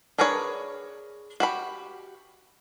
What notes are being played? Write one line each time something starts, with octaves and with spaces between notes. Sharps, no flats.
D4 G#4 A#4 B4 C#5
F#4 G4 B5